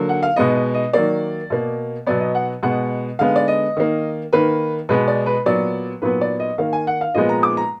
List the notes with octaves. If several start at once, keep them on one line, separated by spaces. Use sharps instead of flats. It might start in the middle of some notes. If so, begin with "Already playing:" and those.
Already playing: D3 F#3 A#3
F#5
F5
B2 G#3 B3 D#5
D#5
D#5
D#3 F#3 A#3 D5
B2 A#3
B2 F#3 B3 D5
D#5
F#5
B2 G#3 B3 F#5
D3 G#3 B3 F5
D5
D#5
D#3 A#3
D#3 A#3 B4
B2 G#3 B3 B4
D5
B4
A#2 F#3 B3 D5
A#2 F#3 B3 B4
D5
D#5
D#3 A#3 F5
G#5
F#5
F5
A#2 F3 G#3 B3 D#5
A#5
D6
A#5